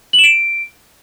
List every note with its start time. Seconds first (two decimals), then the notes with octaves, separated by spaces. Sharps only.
0.13 F#7
0.18 E7
0.24 D7